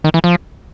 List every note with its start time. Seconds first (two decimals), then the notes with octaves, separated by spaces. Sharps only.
0.04 D#3
0.14 E3
0.24 F3